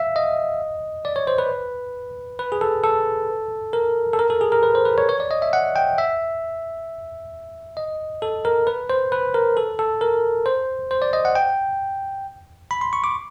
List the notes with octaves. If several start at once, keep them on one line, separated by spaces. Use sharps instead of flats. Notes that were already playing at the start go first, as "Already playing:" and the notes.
Already playing: E5 F5
D#5
D5
C#5
C5
B4
B4
G#4
A4
A4
A#4
A4
A#4
A4
G#4
A#4
B4
C5
B4
C#5
C#5
D5
D#5
E5
F#5
G5
E5
D#5
A4
A#4
B4
C5
B4
A#4
A4
A4
A#4
C5
C5
D5
D#5
F#5
G5
B5
C6
C#6
D6